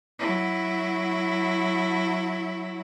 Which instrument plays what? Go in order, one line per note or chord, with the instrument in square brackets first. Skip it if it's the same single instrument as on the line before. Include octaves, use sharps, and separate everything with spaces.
[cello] F#3 E4